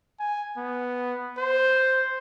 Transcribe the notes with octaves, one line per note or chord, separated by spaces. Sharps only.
G#5
B3
C5